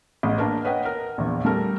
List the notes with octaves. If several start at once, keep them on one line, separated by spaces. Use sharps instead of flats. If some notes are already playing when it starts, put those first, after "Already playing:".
A1 G#4 D#5
A#3 D4 A#4 B4
B4 C#5 D#5 F#5 G5
A#4
A#1 E2
G3 A3 A4 A#4